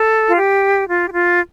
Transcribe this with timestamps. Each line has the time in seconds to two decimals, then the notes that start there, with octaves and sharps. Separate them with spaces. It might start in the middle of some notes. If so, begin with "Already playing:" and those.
Already playing: A4
0.28 F4
0.36 G4
0.88 F4
1.09 G4
1.13 F4